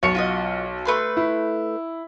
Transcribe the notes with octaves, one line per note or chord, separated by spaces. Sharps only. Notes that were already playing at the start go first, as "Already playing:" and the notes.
B1 C#5 A5 C#7
F4 F#4 D#5
A3 B4 C6
E4